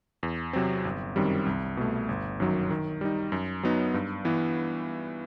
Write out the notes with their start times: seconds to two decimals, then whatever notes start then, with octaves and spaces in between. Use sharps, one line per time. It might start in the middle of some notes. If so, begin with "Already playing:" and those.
0.23 E2
0.53 C3 F#3 C4
0.85 G1
1.16 F#2 D#3 G3 C4
1.46 C2
1.77 B2 A3
2.09 G1
2.40 F#2 D#3 F#3
2.70 D#3
3.01 G3 D#4
3.32 F#2
3.63 F#3 B3 D#4
3.94 G2
4.25 E3 B3